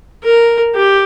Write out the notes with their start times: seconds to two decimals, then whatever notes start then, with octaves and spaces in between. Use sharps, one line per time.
0.24 A#4
0.75 G4